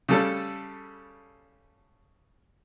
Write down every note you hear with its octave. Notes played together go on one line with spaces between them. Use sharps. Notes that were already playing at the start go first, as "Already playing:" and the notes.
C#3 G3 A4 A5